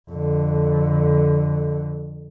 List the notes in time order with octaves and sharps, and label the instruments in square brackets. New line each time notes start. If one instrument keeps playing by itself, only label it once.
[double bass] F2 D3